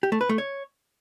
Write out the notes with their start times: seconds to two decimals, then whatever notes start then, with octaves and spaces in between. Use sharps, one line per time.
0.03 G4
0.12 A3
0.21 B4
0.29 A3
0.38 C#5